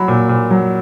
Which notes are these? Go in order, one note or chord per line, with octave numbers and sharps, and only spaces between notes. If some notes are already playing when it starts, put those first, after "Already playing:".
Already playing: F#3 B5
A#2
A#2
F#3